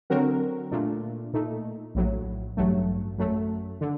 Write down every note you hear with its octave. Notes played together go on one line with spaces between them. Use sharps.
D3 F#3 C4 F#4 A#4
A#2 A3 D4
A#2 A3 D#4
A#1 A2 F#3
A1 G2 F#3 A3
F#2 F#3 A3
D3